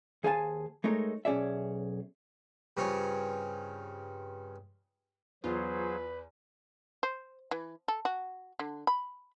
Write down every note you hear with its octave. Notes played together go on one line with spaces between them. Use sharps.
D#2 G#4 C5 F5 G#5 A5
G#3 A3 D#4 A#4 C#5
B1 C#4 G#4 D5 E5
G2 C#3 C4 F4 C#5 G#5
E2 F#3 F4 G#4 B4 C5
C5
E3
A4
F#4
D3
B5